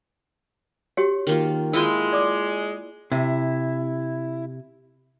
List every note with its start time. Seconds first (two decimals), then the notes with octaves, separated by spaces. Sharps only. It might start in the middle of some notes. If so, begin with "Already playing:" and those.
0.97 F#4 G4 C#5
1.27 D#3 A#3 F4
1.73 G#3 E4 F4 G5 E6
2.13 D5 D6
3.12 C3 E4